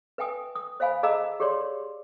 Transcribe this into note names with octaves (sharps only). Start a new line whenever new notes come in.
B4 E5 G5 G#5 D#6
D#6
C5 E5 F5 G#5 B5
G#4 D#5 F5 A5 A#5 E6
G4 G#4 C#5 D5 C6